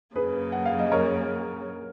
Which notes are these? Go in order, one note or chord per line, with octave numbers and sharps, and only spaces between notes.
F#2 C#3 F#3 A#3 G#4 B4
F#5
F5
D#5
A#4 C#5